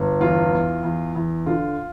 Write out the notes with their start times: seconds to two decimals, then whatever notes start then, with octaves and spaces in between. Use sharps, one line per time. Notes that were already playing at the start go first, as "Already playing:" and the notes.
Already playing: G1
0.20 E2 F4
0.52 E2
0.83 E2
1.15 E2
1.46 D3 F4